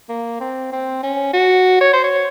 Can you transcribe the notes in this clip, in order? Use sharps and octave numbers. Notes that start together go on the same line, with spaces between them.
A#3
C4
C4
C#4
F#4
C#5
C5
C#5